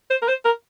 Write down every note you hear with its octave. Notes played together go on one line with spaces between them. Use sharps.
C5
A#4
C5
A#4